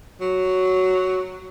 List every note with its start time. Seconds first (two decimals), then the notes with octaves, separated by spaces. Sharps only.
0.21 F#3